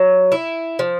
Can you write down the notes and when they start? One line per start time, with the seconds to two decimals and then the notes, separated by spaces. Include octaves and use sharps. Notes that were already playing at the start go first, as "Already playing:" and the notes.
Already playing: F#3
0.32 E4
0.79 F3